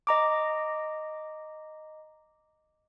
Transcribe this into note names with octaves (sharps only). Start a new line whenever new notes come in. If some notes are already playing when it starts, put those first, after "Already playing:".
D#5 A#5 D6